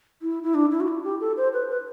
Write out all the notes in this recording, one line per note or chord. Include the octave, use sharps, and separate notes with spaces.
E4
E4
D4
E4
F#4
E4
G4
A4
C5
B4
B4